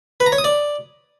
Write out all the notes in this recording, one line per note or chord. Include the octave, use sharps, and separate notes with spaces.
B4
A#5
C#5
D#6
D5